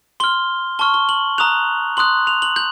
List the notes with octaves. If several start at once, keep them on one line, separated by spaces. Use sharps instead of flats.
C6 F6 G7
A5 C#6 F6 G7
G7
F#7
A#5 D#6 F#6 F7
C6 D#6 F#6 F#7
F7
F#7
G6 F#7